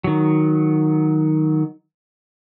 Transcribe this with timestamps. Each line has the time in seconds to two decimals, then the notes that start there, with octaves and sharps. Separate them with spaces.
0.04 D#3 F#3